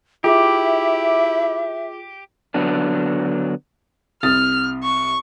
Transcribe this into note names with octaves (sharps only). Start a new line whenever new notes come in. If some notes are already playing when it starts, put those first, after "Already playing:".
E4 F4 G4 G#4 E5 D6
D3 F#3 B3 D4
C2 D#6 F6 A6
C#6